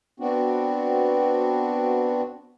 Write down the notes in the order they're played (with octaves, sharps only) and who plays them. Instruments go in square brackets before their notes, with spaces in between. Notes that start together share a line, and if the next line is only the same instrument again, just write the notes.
[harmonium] B3 C4 D4 F#4